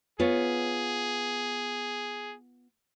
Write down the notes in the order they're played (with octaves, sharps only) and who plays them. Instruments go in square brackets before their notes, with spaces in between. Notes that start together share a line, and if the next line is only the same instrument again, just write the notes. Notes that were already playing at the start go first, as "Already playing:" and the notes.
[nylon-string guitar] B3 F4 C#5 [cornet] G#4